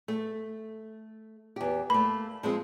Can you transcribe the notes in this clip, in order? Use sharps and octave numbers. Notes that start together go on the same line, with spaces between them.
A3
E2 G4
A3 A#3 B5
F3 G#3 C4